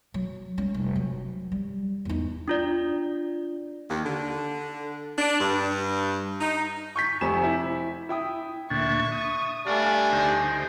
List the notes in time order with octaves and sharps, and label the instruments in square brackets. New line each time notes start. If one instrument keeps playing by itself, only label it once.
[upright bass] F#3
G3 C#4
F1
F#3
G3
E2 D#4
[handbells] D4 F4 D5
[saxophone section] D#2
D3
D4
G2
D#4
[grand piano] C#6 G6 B6
F1 C3 G#5 E7
E4
E4 G5 D#6
[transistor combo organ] D2 A#2 D4 [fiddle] E5 C#6
[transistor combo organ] D#6
[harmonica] G3 D4 [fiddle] A3 G#5 [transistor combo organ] D5 F5
[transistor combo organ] D2 D#4 C5